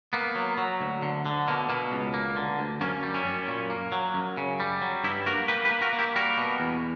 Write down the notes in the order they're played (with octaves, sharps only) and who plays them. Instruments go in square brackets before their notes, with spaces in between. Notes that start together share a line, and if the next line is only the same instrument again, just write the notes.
[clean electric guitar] A#3 B3
F#3
F#3
D2
D3
D3
B2 A#3
B2 A#3
C#2
A#3
D3
D2
F#2 A#3 C#4
G3
C#4 E4
F#2
A#2
A#3
F#3
F#2
C#3
G3
F#3
G2 E4 G4
A#3 F#4 A#4
A#3 G4 B4
G4 B4
A#3
F#4 A#4
A#3
E4 G4
G3 F#4 A#4
B2
E2